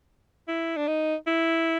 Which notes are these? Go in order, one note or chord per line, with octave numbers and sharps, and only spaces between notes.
E4
D4
D#4
E4